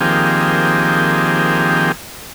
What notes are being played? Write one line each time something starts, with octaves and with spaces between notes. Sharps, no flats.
D#3 F3 A#3 C4 G4 G#4